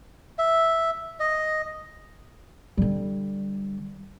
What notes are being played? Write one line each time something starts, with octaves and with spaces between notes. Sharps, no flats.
E5
D#5
D3 G3